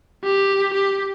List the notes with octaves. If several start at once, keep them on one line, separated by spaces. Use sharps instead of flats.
G4
G4